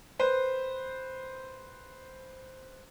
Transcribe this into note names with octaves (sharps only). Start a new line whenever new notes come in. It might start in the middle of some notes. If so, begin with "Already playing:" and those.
B4 C5